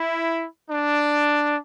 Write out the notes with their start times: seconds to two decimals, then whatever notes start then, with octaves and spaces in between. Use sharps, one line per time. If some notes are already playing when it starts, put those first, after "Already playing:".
Already playing: E4
0.70 D4